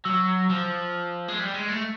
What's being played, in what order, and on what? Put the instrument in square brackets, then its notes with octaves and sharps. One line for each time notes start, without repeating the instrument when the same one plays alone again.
[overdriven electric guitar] F#3 [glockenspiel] E6
[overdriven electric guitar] F3
G#3
G3
G#3
A3